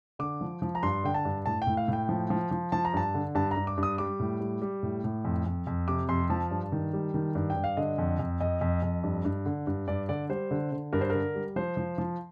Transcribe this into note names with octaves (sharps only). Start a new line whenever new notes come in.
D3 D6
F3
F3
A#5
G2 C6
D3 G5
A5
G2
A2 A5
G5
A2
F5
A2
G5
F3
F3
F3
F3 A5
A#5
G2 A5
D3
G2 A5
A#5
G2
D6
G2
D#6
G3 D6
A2
G3
G3
A2
A2
F2
F2
F2
C3 D6
F2 C6
F3 A5
G2
D#3
G3
D#3
G2
G5
G2
F5
D3 D#5
F2
F2
F2 D#5
F2
F2
G2
G2
D3
G2
G2 D5
D3 D5
G3 C5
D3
D3
G2 A#4
C5
D3 A#4
G3
F3 C5
F3
F3